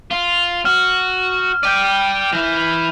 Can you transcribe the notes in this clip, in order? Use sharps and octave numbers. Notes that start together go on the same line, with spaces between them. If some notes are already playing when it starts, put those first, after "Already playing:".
F4
F#4 F6
D5 G5 G6 D#7
E3 E4